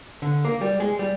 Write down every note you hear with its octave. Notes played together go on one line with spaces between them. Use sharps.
D3
A#3
G3
G#3
G3